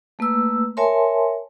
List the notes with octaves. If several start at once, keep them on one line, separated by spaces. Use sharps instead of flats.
A3 A#3 B4 E6
A#4 C#5 E5 G#5 A5 C6